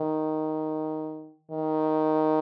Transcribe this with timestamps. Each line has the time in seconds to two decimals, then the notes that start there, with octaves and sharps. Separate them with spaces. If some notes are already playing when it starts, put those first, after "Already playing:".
Already playing: D#3
1.51 D#3